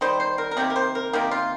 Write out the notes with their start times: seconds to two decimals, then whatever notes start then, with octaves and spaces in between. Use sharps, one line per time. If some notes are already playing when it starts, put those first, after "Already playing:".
0.01 D#3 G3 C5
0.20 C5
0.38 A#4
0.51 A#4
0.57 C3 D#3 A#3 G4
0.70 A#4
0.76 C5
0.95 A#4
1.13 C3 D#3 A#3 G4
1.31 F4